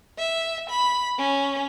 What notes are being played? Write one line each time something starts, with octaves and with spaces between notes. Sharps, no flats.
E5
B5
C#4